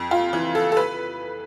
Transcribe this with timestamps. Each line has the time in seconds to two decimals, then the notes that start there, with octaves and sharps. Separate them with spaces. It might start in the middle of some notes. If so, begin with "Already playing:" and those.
Already playing: F2
0.11 F4
0.33 E3
0.55 A4
0.72 A4
0.77 B4